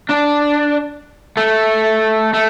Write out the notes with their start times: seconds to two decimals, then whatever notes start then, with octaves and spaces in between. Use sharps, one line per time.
0.10 D4
1.37 A3
2.33 A3